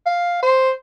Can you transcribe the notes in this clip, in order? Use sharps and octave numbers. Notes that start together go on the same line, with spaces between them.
F5
C5